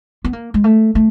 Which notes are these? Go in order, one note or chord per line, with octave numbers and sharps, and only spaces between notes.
B3
A#3
G#3
A3
A3